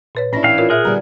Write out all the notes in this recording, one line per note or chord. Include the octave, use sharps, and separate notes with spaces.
A#2 B4 C#5
A2 C#4 D4 E4 A#6
E3 F5 G5
F4 A#4 C#5
A#2 G#4 A#4 E5 F#5
D3 G3 B3 A#5